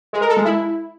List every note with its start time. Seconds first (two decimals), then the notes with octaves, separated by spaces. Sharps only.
0.13 G#3
0.21 A#4
0.29 A4
0.37 G#3
0.45 E4